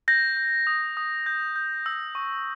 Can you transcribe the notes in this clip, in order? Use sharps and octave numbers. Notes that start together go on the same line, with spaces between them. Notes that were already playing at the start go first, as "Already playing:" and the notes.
G6 A#6
G6
D#6
D#6
G6
G6
E6
C#6